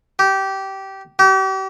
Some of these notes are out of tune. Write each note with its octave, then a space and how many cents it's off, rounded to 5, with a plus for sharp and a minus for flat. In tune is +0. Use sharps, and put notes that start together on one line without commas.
G4 -20
G4 -40